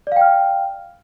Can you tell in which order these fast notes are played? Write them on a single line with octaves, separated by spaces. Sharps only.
D5 F5 G5 F6